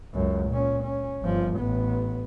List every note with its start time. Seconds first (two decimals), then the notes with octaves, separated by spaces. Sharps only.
0.14 C#2 F#2
0.50 A#2 C#4
0.83 C#4
1.22 G1 F3
1.58 A1 B3